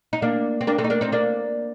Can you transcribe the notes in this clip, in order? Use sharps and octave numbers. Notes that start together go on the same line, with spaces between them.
D#4
A#3 D4
C4
A#3 D4
A3 C4
D#4
A#3 D4
C4 D#4
A#3 D4